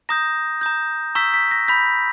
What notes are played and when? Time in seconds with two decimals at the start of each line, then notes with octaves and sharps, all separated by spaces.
0.09 A#5 D#6 G6 A#6
0.61 A#5 D#6 G6
1.15 A#5 C#6 E6 G6 B6
1.34 B6
1.51 A#6
1.68 B5 G6 B6